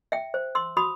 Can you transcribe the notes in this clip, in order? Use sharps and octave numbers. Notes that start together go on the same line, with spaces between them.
E5 G5
C5
C6 E6
F#4 B5 D#6